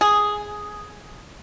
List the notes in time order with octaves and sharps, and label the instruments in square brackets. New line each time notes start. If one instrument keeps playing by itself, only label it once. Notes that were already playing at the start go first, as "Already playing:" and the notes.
[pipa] G#4